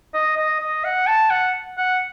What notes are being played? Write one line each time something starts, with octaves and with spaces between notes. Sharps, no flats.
D#5
D#5
D#5
F#5
A5
F#5
F#5